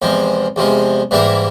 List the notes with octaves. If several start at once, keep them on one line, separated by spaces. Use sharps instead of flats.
E2 C3 F3 G#3
E2 C3 F3 G#3
G#2 E3 G3 A#3 E4